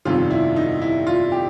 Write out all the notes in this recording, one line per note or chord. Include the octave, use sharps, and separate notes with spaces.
G1 F2 C3 D#3 G3 F4
E4
D#4
E4
F4
G4